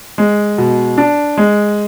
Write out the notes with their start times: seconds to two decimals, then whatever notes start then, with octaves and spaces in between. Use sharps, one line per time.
0.18 G#3
0.58 B2
0.98 D4
1.38 G#3